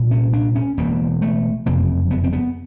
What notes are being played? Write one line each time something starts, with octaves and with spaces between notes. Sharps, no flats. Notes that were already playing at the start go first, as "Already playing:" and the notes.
Already playing: C2 A#2
C#4
D4
C#4
E1 E2 B2 A#3
A3
F#1 F2 C3 A#3
B3
C4
B3